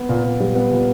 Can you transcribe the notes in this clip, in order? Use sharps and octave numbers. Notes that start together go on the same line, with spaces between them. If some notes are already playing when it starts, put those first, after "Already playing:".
Already playing: B3
A#2
A#2
G3
B3
A#2